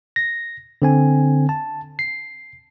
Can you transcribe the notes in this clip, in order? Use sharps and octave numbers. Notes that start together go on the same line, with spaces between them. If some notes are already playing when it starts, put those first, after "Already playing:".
A#6
D3 C4 G#5
A5
C7